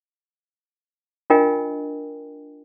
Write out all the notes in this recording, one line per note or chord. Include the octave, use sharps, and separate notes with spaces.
D4 F4 A#4 D#5 G5 G#5